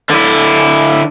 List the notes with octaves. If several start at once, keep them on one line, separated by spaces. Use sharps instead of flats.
D3 E4